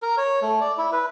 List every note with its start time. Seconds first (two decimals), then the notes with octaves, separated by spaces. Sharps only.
0.02 A#4
0.17 C#5
0.42 A3
0.61 D5
0.78 E4
0.92 B4